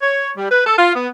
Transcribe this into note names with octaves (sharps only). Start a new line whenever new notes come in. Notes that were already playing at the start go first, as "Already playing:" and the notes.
C#5
G3
B4
A4
F4
B3